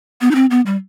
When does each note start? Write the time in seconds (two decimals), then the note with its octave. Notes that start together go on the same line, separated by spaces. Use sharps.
0.21 B3
0.31 D#4
0.35 C4
0.50 B3
0.66 G3